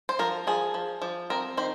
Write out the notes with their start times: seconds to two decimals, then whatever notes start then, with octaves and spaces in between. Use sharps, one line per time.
0.09 C5
0.19 F3 A#4
0.47 F3 G#4
0.74 F3
1.02 F3
1.30 C4 A#4
1.57 D#3 C5